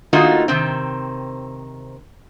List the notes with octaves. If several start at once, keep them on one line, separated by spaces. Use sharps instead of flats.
D#3 A3 A#3 D#4 F4 F#4
C3 D#3 C4